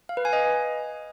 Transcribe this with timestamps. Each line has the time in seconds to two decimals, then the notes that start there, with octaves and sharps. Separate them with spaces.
0.09 F5
0.17 B4
0.25 G#5
0.33 D#5